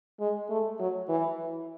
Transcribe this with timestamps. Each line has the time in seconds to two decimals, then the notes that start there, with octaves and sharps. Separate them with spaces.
0.20 G#3
0.50 A3
0.80 F#3
1.09 E3